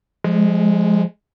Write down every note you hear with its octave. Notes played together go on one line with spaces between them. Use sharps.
F3 G#3